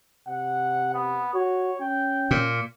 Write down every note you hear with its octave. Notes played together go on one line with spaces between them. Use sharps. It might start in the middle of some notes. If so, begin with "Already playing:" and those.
C3 F#5
B3
F#4 C#5
C#4 G5
A#2